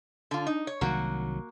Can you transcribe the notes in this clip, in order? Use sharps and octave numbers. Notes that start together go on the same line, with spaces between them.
D3 F4
D#4
C#5
C2 D#3 F#3 A#3 F#4